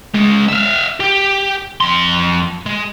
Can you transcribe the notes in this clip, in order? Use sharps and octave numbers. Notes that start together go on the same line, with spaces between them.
C#2 G#3
E5 F5
G4
F2 C6
G#3